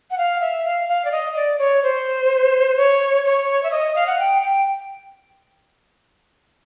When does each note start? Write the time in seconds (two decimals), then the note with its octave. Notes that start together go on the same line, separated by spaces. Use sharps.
0.11 F#5
0.18 F5
0.41 E5
0.65 F5
0.89 F5
1.05 D5
1.12 D#5
1.36 D5
1.59 C#5
1.83 C5
2.77 C#5
3.25 C#5
3.63 E5
3.71 D#5
3.96 F5
4.07 F#5
4.19 G5
4.42 G5